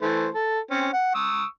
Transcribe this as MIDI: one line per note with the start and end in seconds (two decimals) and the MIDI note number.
0.02 0.28 52
0.02 0.28 57
0.02 0.28 72
0.35 0.60 69
0.71 0.89 60
0.71 0.89 61
0.93 1.09 78
1.15 1.45 85
1.15 1.45 87
1.15 1.45 88